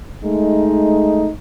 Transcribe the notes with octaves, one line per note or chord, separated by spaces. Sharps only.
G#3 A3 D#4